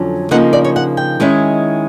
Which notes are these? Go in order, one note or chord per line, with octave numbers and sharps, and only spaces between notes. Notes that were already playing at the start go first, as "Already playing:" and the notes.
Already playing: F2 D3 F#3 C#4
C#3 F3 A#3 D#4 F#5
D5
C#5
F#5
G5
D#3 G#3 C#4 E4